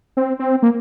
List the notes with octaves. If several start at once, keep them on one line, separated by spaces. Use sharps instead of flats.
C4
C4
A#3